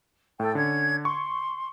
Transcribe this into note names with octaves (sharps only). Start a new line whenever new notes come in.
A2 A4 G5
D3 C#4 G#6
C6 C#6